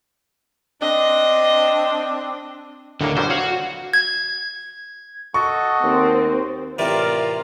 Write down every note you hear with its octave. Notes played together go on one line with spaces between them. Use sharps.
C4 D4 D#5
D#2 A2 D3 A#3
F2 F#3 G3 C5
F#4 C#5 F5
G#6
F#4 A4 D#5 C#6
D#2 C4
A2 C3 E3 F4 A#4 D5